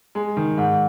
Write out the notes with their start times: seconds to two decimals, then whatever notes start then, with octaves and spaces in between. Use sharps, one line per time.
0.15 G#3
0.37 D#3
0.58 G#2